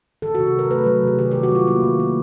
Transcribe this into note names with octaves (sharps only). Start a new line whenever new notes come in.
D#3 A4
C3 F#4
G#4
F#3 A#4
A3 B4
F#3 B4
C3 G#4
D#3 G4
D#3 G4
F#4
F#3 F4
A#3 E4
D#3
A#3